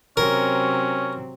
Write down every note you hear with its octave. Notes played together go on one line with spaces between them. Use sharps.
C3 F#3 C4 C#4 A#4